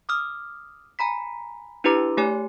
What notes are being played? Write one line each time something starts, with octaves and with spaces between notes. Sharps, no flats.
D6 D#6 F6
G#5 A#5 B5 B6
D4 E4 G4 B4 A#5 D6
A3 G4 C#5 G#5